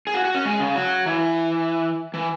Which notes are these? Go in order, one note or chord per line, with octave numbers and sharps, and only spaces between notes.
G#4
F#4
F#4
C#4
G#3
C#3
F#3
E3
E3